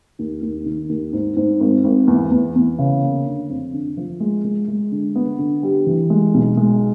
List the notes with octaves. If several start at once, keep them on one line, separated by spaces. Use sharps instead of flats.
D#2
D#2
D#3
D#2
G#2
G#2
G#1
G#1
E2
E2
E2
C#3
A#3
D3
F2
D3
F3
G#3
G#3
G#3
D3
B3
D3
G3
E3
G#3
B1
G#3